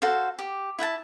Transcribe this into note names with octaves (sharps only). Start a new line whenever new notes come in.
F#4 A4 C5 F5
G4
E4 E5 F#5 A5